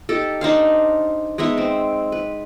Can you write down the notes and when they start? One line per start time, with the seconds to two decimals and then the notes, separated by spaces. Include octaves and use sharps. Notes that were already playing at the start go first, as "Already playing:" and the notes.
0.09 D#4 G4 A4
0.41 D4 D#4 C5 F5
1.38 G#3 B3 D#4 E5
1.57 C4
2.12 B4